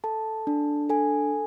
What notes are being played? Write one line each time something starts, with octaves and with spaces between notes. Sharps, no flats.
A4 A5
D4
A4 G#5